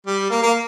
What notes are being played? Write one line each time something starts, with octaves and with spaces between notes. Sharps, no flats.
G3
A#3
A#3